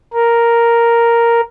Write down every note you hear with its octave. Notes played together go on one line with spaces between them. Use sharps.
A#4